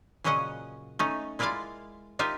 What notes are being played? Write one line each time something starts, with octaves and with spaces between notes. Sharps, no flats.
A#2 C#3 F#3 C#4 D#5 F#5
A3 C#4 D#4
G#3 E4 F4 A#4 D5 F5
D#4 F4 G4 A#4 E5